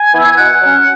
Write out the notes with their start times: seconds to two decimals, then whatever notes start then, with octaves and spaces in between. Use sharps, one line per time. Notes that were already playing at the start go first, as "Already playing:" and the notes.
Already playing: G#5
0.13 E3 B3 E4
0.36 B2 F#5
0.61 F#3 C#4